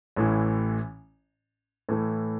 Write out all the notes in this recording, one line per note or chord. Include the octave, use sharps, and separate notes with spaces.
A1 A2 E3
A2 E3 A3